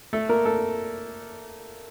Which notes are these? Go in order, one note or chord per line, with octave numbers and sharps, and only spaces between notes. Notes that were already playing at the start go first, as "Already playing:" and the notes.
A3 A4
A#3 A#4
A3 A4